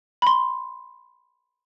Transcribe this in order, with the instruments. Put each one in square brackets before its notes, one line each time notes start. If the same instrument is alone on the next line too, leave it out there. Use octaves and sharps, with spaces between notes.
[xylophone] B5 C6